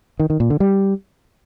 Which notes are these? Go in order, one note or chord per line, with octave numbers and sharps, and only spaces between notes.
D#3
D#3
A#2
D3
G3